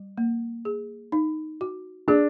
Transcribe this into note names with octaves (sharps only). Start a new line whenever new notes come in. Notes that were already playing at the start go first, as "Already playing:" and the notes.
Already playing: G3
A#3
G#4
D#4
F#4
D4 G#4